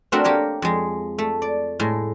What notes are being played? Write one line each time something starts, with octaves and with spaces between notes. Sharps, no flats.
A3 C4 D4 F#4 A#4
A#3 G4 A#4 C#5
F2 G#3
A3
D5
A2 G#3